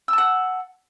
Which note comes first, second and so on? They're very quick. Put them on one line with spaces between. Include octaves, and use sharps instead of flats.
E6 A5 F#5